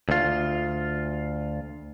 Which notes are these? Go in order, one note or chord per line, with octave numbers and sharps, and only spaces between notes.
D2 F4